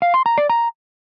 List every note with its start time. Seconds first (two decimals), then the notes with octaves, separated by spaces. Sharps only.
0.02 F5
0.14 C6
0.26 A#5
0.38 D5
0.50 A#5